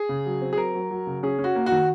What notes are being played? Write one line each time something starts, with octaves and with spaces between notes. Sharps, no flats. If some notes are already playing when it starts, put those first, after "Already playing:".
Already playing: G#4
C#3
F#3
C4
G#4
F#3 A#4
F#3
F#3
C#3
C#4 G#4
C#4
F#4
A#3
F#4
D#3